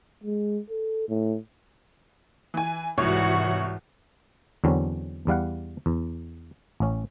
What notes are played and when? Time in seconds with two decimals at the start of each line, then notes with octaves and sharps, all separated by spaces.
0.24 G#3
0.70 A4
1.09 A2
2.54 E3 G#5
2.98 C2 G#2 E3 F#4 C#5
4.64 E2 D3 F#3 C4 C#4
5.27 E2 G3 F5 F#5
5.86 E2
6.80 A1 C#4